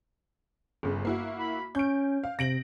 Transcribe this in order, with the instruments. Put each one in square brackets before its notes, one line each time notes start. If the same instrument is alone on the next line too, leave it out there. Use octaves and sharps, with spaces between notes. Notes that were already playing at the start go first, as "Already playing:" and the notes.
[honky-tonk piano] G1 C#3
A#3 E4 F#4
[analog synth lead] B5
[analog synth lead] C#4 [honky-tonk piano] G6 D7
[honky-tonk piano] F5
[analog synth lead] C3 [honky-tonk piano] A#6 D7 F#7